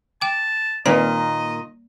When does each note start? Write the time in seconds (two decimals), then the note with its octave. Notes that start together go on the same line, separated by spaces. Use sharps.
0.21 G5 A5 D6
0.86 A#2 D#3 G3 A#3 C4 B4 D#5 A#5